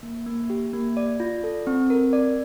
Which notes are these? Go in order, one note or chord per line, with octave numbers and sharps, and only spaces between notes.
A#3
A#3
G4
A#3
D5
F4
A4
C4
A#4
D5